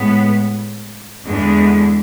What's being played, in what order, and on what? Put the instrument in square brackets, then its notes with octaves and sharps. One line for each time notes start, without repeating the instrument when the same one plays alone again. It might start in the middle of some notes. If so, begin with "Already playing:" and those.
Already playing: [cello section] A2 G#3 B3
E2 D3 G#3